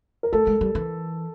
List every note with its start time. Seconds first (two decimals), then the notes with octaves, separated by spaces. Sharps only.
0.23 A#4
0.33 A3 A4
0.47 G#3
0.61 G3
0.75 E3